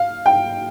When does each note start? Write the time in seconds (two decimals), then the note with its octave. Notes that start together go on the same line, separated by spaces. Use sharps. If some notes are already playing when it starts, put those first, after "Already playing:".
Already playing: F5
0.26 G5